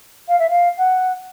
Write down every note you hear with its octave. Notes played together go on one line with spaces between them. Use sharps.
F5
E5
F5
F#5